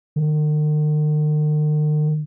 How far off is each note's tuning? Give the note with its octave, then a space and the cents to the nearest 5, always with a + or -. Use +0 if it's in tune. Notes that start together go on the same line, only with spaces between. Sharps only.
D#3 -45